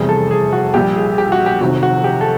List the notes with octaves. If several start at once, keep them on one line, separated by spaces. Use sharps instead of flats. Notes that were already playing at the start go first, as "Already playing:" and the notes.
Already playing: F1 E2 C3 E3 G3 G#4
A4
G#4
F#4
A#1 A#2 G3 G4
G#4
G4
F#4
G4
F1 F2 C3 D#3 F#3 F#4
F#4
G4
A4